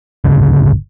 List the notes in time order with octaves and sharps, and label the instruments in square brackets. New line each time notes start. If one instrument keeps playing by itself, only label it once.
[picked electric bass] D1 G1 C#2 C#3